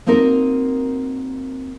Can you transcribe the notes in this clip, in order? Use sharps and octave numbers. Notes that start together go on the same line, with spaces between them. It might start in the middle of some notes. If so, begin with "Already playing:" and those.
A#3 C4 D#4 F#4 A#4